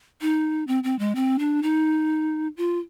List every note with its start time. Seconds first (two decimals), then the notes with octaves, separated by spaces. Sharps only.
0.21 D#4
0.67 C4
0.84 C4
0.99 G#3
1.15 C4
1.39 D4
1.63 D#4
2.57 F4